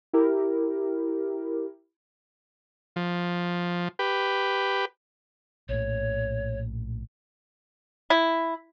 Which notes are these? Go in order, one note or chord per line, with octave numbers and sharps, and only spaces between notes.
E4 G4 A#4
F3
G4 B4
A#1 A2 C#5
E4